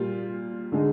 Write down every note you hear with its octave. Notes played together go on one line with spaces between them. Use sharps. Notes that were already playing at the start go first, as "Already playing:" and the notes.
Already playing: A#2 G3 A#3 F4
D3 G#3 D#4